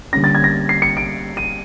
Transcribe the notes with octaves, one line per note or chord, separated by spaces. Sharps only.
D3 G3 A#3 C#4 A#6
A6
G#6
A#6
C7
C#7
D7
D#7